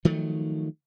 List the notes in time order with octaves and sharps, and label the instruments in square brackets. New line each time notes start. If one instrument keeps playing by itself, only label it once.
[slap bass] D#3 F3 F#3 A3